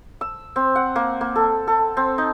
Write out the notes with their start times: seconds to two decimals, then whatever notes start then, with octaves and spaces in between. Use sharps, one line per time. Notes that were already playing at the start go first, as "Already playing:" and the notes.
0.21 E6
0.56 C4
0.76 F#5
0.96 A#3
1.21 A#3
1.36 A4
1.67 A4
1.97 C4
2.18 D#4